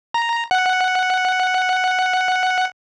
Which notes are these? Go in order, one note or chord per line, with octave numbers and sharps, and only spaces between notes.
A#5
F#5